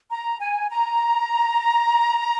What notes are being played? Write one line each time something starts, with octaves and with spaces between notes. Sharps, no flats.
A#5
G#5
A#5